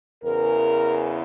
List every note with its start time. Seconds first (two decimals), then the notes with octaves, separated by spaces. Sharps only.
0.23 E2 C#3 E3 A#4